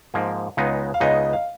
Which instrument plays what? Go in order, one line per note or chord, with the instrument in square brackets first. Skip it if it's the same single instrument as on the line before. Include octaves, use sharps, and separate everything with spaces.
[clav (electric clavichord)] G#2 F3 A#3
C#2 C#3 G#3 B3 D#4
[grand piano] F5
[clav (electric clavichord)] C#2 C#3 G#3 B3 D#4 [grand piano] D#5
[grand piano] F5